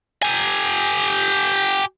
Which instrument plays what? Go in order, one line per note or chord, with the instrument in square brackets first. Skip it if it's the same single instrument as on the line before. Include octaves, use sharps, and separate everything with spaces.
[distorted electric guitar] G4 G#5